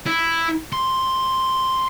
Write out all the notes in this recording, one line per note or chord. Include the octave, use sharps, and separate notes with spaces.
E4
C6